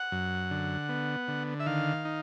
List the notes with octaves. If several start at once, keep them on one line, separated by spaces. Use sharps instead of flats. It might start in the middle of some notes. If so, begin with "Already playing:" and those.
Already playing: F#5
F#2
D3
B3
D3
E5
D#3 F5
D#4